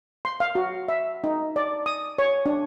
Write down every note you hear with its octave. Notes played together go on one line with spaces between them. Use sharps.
C6
F5
F#4
E5
D#4
D5
D#6
C#5
D4